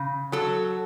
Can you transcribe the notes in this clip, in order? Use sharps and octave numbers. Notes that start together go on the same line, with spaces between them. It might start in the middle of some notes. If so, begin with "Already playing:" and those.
Already playing: C#3
F#3 A4